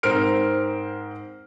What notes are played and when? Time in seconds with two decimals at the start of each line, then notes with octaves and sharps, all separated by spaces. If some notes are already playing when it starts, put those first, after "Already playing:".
0.03 G#2 C4 A#4 C5 F6 D7